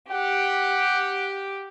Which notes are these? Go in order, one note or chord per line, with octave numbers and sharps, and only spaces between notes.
G4 F#5